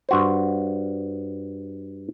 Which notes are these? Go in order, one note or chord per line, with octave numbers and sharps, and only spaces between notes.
G2 F#4 C5